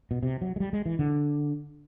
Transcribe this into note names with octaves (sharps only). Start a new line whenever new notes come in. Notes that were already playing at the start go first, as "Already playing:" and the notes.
B2
C3
F#3
G#3
G3
G#3
E3
D3